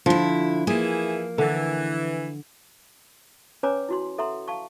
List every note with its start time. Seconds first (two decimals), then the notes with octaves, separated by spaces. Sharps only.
0.06 D3 F3 E4
0.67 E3 A#3 E4 G#4
1.38 D3 E3
3.63 C#4 B4 C#5 G#5 A#5 D6
3.89 E4 F#4 C6
4.18 A4 E5 F#5 A#5 C6
4.48 F5 A5 C#6